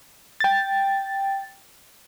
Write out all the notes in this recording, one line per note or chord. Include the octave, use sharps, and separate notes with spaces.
G5 A6